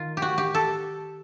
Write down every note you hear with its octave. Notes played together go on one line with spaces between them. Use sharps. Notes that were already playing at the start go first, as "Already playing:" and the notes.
Already playing: D#3 F4
G4
F#4
G4
A4